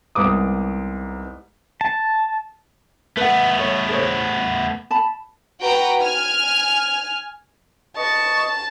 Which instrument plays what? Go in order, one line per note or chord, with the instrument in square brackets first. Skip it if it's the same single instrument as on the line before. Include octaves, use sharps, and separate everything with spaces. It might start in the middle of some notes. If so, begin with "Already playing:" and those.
[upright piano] C2 G#2 B3 D6 D#6
[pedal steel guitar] A5
[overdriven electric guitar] A3 B3 [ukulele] B4 F#5
[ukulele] C#5
G#4 C5 C#5
A5 B5
[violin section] F#4 B4 G5 A#5
G#5 F6
[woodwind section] B4 D#5 C#6 [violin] A5